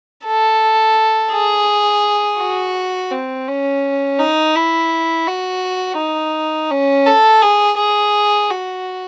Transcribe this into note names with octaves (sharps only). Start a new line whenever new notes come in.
A4
G#4
F#4
C4
C#4
D#4
E4
F#4
D#4
C#4
A4
G#4
G#4
F#4